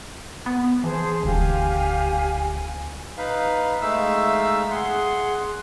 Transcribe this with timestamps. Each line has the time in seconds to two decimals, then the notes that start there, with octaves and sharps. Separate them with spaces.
0.46 B3
0.84 E3 G#4 C5 A5
1.23 E1 D2 G4 F5 G#5
2.38 G#5
3.18 D#4 B4 F5
3.82 G#3 A3 D#4 E5 F5 E6
4.71 G#4 F#5 C6